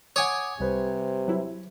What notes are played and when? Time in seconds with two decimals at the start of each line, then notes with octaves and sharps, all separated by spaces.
0.16 C#5 F#5 G#5 D6 D#6
0.60 C2 C3 G3 B4 C5
1.28 F#3 E4